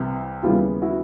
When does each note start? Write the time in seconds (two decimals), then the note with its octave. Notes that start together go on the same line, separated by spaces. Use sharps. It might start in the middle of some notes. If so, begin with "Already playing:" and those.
Already playing: C2 C3 E3
0.43 D#2 C#3 E3 G3 B3 F4 G4
0.82 E4 F#4